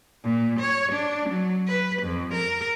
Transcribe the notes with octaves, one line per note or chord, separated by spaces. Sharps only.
A#2
C#5
D4
F#3
B4
F2
A#4